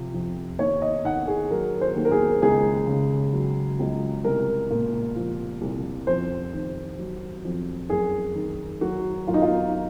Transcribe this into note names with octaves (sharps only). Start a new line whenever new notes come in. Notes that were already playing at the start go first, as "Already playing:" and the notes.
Already playing: C3 F3
F2
D#2 C#5
D#5
D#3 F#5
G#4
F#3 A#4
C5
D#2
A#4
G#4
C#2 G#4
C#3
F#3
C#2
C2 A#4
A#2
F3
C2
F2 C5
D#3
F#3
F2
F#2 G#4
D#3
F#3 F#4
F#2 F4
D#4
F4